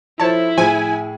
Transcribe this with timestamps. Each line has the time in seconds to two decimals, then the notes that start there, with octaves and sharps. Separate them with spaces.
0.19 F3 E4 A4 C5 C#5 A5
0.58 A2 F3 G#4 G#5